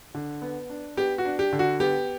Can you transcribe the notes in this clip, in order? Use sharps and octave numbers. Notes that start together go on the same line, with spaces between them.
D3
B3
D4
B3 G4
F#4
D4
G4
D3
F#4
B3 G4